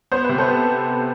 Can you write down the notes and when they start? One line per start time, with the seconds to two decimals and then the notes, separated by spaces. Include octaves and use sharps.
0.12 B3 C5
0.25 C3 B4
0.38 A4 C5
0.48 B3